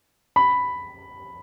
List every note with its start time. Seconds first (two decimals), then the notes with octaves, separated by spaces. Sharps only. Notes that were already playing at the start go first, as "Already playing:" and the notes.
0.36 B5